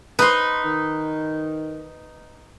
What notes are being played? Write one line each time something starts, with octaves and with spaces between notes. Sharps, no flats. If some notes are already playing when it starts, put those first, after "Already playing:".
D#4 B4 C6
D#3